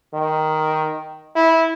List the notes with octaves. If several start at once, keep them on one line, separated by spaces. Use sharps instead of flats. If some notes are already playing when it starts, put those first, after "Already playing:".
D#3
E4